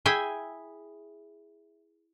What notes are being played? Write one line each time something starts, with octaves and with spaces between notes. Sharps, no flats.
E4 G#4 E5 G5 G#5